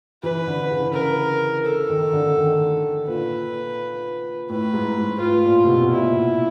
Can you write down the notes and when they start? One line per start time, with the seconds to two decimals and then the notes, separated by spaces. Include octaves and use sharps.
0.23 E3 B4
0.47 D3
0.71 C#3
0.94 A#4
1.66 A4
1.90 D#3
2.13 D3
2.37 D#3
3.07 A#2 B4
4.49 A2 B4
4.74 G#2
4.98 G#2
5.20 A2 F4
5.44 A#2
5.64 C3
5.68 B2
5.82 B2
5.91 A#2 E4